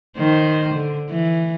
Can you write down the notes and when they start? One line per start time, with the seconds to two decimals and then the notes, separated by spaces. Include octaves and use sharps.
0.17 D#3 C5
0.75 D3
1.10 E3